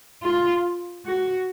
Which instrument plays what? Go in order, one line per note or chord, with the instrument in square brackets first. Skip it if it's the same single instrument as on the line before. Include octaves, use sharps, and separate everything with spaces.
[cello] F4
F#4